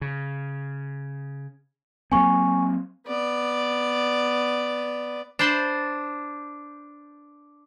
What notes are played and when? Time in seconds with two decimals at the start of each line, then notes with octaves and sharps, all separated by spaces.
0.01 C#3
2.12 F#3 A#3 C4 G#5 C#6
3.06 B3 D5
5.39 D4 C5 A5 B5 C6